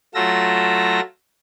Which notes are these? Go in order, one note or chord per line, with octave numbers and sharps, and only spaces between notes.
F#3 A3 F4 E6 A#6